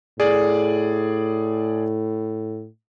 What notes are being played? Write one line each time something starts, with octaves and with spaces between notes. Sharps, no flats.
A2 G#4 D5